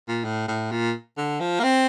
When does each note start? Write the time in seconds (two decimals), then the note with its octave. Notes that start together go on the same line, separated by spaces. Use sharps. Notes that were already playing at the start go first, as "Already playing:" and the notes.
0.08 A#2
0.24 A2
0.48 A2
0.71 A#2
1.17 D3
1.40 F3
1.59 A#3
1.63 C4